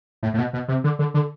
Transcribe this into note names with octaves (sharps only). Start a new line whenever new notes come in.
A2
A2
B2
B2
C3
D3
D3
D3